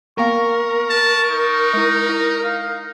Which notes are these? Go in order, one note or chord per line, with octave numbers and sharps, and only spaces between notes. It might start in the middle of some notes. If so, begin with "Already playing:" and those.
A#3 B3 A#4 F5 C#6
A5
D#4
G#3 E4
E4
F5